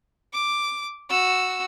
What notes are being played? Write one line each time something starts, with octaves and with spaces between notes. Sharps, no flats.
D6
F#4 E6